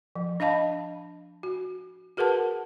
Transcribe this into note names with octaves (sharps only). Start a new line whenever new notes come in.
F3
D4 D#5 F5 A5 B5
F#4
F#4 G#4 A#4 B4 F#5 A5